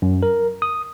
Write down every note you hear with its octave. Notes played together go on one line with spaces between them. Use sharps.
F#2
A#4
D#6